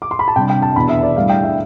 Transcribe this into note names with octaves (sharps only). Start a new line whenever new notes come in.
D6
C6
B5
A5
C3 G3 D4 G5
G5
A5
E2 B2 B3 D4 B5
E5
D5
A2 G3 D4 F5
G5
E5